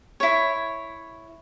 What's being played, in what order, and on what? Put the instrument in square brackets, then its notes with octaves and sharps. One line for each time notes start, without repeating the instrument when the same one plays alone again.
[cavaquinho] E4 C#5